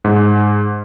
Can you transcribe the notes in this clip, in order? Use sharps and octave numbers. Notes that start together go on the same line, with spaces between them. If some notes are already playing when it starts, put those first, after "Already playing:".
G#2